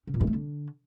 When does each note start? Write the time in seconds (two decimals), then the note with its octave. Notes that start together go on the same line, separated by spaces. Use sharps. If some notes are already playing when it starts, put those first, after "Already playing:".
0.07 C#3
0.14 A#2
0.21 G2
0.27 A3
0.34 D3